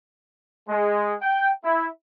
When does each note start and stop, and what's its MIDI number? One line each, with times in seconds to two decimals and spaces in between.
0.69 1.13 56
1.22 1.50 79
1.64 1.87 64